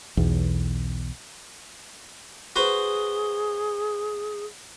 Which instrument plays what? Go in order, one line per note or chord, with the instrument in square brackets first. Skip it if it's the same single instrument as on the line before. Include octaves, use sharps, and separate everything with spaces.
[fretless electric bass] B1 E2
[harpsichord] F#4 B4 C5 [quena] G#4